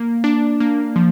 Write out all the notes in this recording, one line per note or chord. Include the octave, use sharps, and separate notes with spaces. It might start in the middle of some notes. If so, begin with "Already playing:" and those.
Already playing: A#3
D4
A#3
F3